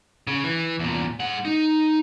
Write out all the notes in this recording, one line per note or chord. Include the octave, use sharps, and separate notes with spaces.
C#3
E3
E2 A#2
G#3 F#5
D#4